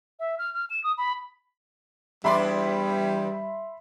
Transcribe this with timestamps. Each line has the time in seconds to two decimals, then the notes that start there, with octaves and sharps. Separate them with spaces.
0.19 E5
0.38 F6
0.54 F6
0.70 E7
0.84 D#6
0.98 B5
2.24 E2 G3 D4 D5 E5 B5 C6